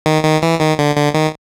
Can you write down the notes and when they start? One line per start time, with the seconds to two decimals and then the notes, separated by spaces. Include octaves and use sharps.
0.06 D#3
0.24 D#3
0.42 E3
0.60 D#3
0.79 D3
0.96 D3
1.14 D#3